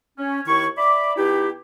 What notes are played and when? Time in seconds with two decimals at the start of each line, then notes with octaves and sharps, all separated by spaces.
0.19 C#4
0.47 D#2 D#3 E4 C#5 C#6
0.77 D5 E5 B5 D6
1.17 B2 D#4 E4 G4